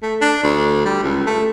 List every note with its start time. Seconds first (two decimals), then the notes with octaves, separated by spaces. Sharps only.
0.02 A3
0.21 D4
0.43 D2
0.86 G3
1.03 C#2
1.27 A3